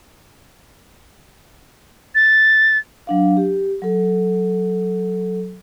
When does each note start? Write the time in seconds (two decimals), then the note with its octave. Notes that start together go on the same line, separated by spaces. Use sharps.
2.15 A6
3.07 F#3 D4 F5
3.37 G4
3.82 F#3 A4